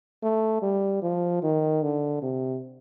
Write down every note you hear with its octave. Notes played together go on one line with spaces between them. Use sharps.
A3
G3
F3
D#3
D3
C3